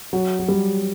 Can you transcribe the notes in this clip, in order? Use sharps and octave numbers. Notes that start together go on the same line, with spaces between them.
F#3
F#3
G3